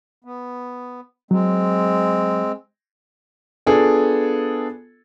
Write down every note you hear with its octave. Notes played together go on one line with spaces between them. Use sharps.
B3
F#3 G#3 C4
B3 D4 F4 G#4 A4